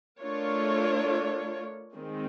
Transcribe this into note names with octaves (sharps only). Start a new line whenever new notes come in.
A3 D4 F4 A#4 C#5
D#3 G#3 C4